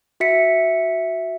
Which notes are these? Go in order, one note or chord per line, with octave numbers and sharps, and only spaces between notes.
F#4 E5 B6 C#7